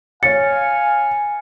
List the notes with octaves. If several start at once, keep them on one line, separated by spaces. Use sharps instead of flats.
C#5 F5 G#5 A6 C#7